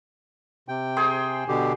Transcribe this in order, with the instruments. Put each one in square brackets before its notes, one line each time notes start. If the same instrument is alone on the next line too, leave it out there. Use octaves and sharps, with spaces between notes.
[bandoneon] C3 G5
[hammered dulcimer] G#4 C5
[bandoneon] B2 D3 G4